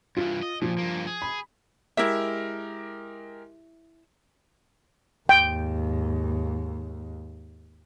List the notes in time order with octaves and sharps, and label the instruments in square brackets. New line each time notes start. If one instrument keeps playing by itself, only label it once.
[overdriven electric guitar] G2 E3 [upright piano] F4
[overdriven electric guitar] D#5
[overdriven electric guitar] A#2 [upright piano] F3
[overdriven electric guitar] G2 A#3
G#4
[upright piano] B5
[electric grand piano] G#3 G4 A#4 [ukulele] E4 E5
[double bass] D#2 G#2 [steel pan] G5